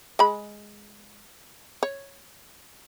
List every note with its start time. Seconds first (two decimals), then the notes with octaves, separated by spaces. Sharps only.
0.19 G#3 B5
1.83 C#5